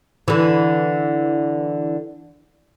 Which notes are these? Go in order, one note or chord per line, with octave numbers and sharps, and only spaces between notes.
D3 E3